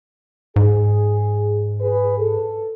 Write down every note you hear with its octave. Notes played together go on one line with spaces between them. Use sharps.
G#2 G#4
G#4 B4
A4